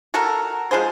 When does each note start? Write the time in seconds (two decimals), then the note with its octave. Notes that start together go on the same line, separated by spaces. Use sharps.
0.14 F#4 A4 A#4
0.71 F3 G#3 G#4 C5